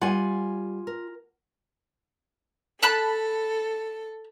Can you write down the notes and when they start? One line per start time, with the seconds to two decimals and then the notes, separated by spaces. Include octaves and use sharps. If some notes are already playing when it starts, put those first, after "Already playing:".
0.01 G3 F4 F#5 G#5
0.87 A#4
2.83 A4 A5 B5 F#6